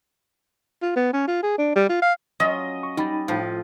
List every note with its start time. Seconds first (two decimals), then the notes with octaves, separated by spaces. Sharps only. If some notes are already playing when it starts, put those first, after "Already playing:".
0.82 F4
0.96 B3
1.13 C#4
1.27 F4
1.43 G#4
1.58 D4
1.75 G3
1.89 F4
2.02 F5
2.40 F#3 C#4 F4 D#5
2.83 C#6
2.97 G3 D#4 B5 A6
3.28 A2 F3